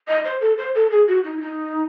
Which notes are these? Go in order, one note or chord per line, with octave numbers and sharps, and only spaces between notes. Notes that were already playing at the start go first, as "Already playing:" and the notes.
D#5
C5
A4
C5
A4
G#4
F#4
D#4
E4
D#4